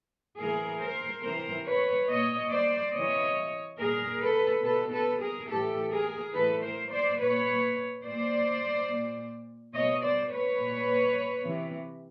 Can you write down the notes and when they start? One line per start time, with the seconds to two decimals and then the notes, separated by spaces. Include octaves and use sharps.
0.38 A2 E3 G#4 A#4
0.81 A#4 C5
1.24 C3 E3 A#4 C5
1.66 B4 C#5
2.08 A#2 C#5 D#5
2.51 C5 D5
2.93 C3 E3 C#5 D#5
3.79 A#2 G#4 A#4
4.21 A4 B4
4.64 B2 A4 B4
4.92 A4 B4
5.21 G#4 A#4
5.49 A2 E3 G4 A4
5.91 G#4 A#4
6.34 A2 E3 A4 B4
6.63 A#4 C5
6.91 C5 D5
7.19 A#2 B4 C#5
8.04 A#2 C5 D5
8.89 A#2
9.74 B2 C#5 D#5
10.03 C5 D5
10.31 B4 C#5
10.59 A#2
11.44 C3 E3